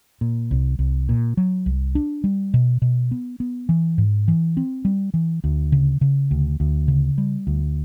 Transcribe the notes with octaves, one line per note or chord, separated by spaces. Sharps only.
A#2
C2
C2
A#2
F#3
C2
D4
G3
B2
B2
B3
B3
E3
G#2
E3
C4
G3
E3
D2
C#3
C#3
D2
D2
C#3
G3
D2